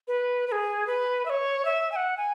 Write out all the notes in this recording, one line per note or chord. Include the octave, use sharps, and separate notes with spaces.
B4
B4
G#4
B4
E5
C#5
E5
G#5
F#5
G#5